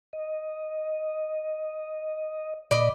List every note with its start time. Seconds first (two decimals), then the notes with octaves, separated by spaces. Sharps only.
0.13 D#5
2.71 A#2 D5 D#5 B5